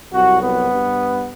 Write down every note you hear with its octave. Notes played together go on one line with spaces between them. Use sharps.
C2 C3 F#3 F#4
B3
G2